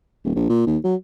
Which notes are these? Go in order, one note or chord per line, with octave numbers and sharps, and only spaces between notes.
D#1
A#1
A#2
D#2
F#3